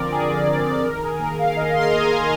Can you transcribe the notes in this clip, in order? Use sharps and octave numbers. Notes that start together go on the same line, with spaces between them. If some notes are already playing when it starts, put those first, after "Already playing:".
Already playing: D3 F3 C4 A#4 D5
D3 G#4
F3 C4 G#4
D#3 A#4
G#4
A#3 A#4
F5
D#3 D#5
C6
A#5
A#3 G#5